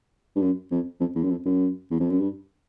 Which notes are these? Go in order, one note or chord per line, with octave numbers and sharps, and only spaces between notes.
G2
F#2
F2
F2
E2
F#2
F2
F#2
E2
F2
F#2
G2